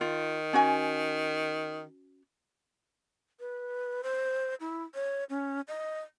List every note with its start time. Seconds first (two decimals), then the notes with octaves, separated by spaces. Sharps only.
0.01 D#3 F4
0.53 C#4 F#4 G#5
3.40 B4
4.03 C5
4.61 E4
4.94 C#5
5.30 C#4
5.68 D#5